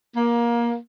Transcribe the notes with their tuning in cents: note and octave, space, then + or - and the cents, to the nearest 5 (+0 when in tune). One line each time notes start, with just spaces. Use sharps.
A#3 +20